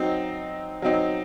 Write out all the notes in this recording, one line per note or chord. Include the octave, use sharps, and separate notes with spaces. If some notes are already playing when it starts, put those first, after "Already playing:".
Already playing: F#3 C4 D#4
F#3 C4 D#4